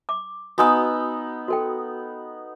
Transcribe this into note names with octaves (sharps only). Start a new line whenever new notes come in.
D6
B3 D#4 F#4 G#5 D#6 E6
F#4 A4 G5